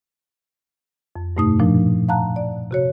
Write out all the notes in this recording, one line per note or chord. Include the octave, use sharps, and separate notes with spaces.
F2
G2 B2 A3 D#4 D#6
A#2 F3 D4
F5 F#5 A5 A#5 F#6
D5
C3 F#4 C#5